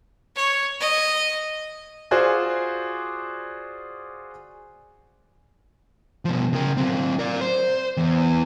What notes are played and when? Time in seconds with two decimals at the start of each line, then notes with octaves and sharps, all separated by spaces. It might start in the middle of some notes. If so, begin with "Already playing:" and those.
0.36 C#5
0.80 D#5
2.11 F4 F#4 G#4 C5 D5
6.25 B2 F3
6.53 C#3 A#4
6.77 F#3 C4
7.19 A#4 D5
7.41 C5
7.97 E2